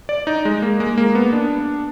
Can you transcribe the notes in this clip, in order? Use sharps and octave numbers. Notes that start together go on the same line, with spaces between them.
D5
D#4
G#3
A#3
G#3
A#3
B3
D4